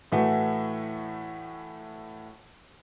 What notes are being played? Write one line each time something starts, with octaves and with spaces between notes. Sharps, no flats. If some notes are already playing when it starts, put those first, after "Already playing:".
A2 E3 A3 F#4